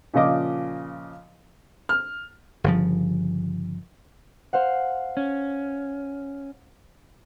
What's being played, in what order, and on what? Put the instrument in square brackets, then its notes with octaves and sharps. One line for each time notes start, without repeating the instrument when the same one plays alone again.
[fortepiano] A#2 C#3 F3 D#5 D6
[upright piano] F6
[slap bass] G1 C#3 F3
[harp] C5 F5 F#5
[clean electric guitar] C#4